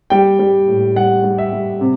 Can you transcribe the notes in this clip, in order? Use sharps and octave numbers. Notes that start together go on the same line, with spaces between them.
G3 G5
G3
A2
G3 F#5
G3
E5
G3
C3